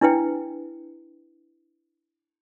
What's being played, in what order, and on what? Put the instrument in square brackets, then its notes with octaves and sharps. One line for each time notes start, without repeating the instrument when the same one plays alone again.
[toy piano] D4 E4 B4 G5